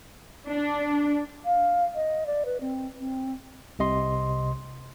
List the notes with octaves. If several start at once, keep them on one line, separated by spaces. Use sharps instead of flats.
D4
F5
D#5
D5
B4
C4
C4
C2 C3 D#5 C6